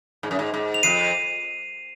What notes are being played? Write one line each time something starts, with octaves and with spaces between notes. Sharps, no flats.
G#2
F#2
G#2
G#2
F7
F2 C7 D#7